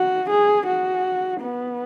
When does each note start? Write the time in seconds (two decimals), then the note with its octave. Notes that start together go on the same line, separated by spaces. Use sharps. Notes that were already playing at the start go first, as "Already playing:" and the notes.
Already playing: F#4
0.30 G#4
0.67 F#4
1.41 B3